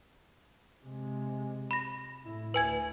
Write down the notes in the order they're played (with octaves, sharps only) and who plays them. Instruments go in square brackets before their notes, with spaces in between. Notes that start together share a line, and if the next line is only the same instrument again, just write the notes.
[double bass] C3 G#3
[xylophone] B5 A#6
[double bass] A2 E4
[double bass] D2 [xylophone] B4 G#5 G#6